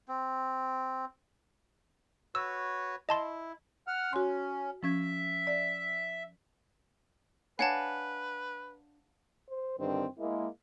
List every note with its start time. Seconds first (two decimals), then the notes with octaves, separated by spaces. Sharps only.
0.08 C4
2.35 F#4 B4 C#5 E6
3.09 E4 D#5 A5 C6
3.87 F#5 F6
4.13 C#4 F#4 C6
4.83 F3 C#4 E5 G#6
5.47 D5
7.59 D4 B4 C#5 F5 F#5 G#5 A5
9.50 C5
9.79 G2 D3 D#3 C4
10.19 G#3 A#3 E4